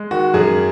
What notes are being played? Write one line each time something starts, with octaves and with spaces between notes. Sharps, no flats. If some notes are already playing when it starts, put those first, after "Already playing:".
Already playing: G#3
D#3 F#4
F#2 G#4